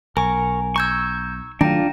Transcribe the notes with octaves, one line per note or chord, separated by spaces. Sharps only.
B1 A#4 G#5 C#6
A#5 C#6 E6 G6 G#6
D#3 F#3 A3 D4 F4 G5 A#5 A#6